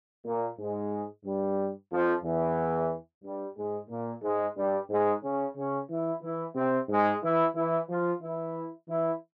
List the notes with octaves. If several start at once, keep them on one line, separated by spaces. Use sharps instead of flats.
A#2 A#3
G#2 G#3
G2 G3
F2 F3
E2 E3
G2 G3
G#2 G#3
A#2 A#3
G#2 G#3
G2 G3
G#2 G#3
C#3 C#4
C#3 C#4
E3 E4
E3 E4
C3 C4
G#2 G#3
E3 E4
E3 E4
F3 F4
E3 E4
E3 E4